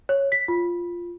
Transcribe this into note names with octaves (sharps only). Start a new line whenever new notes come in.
C#5
B6
F4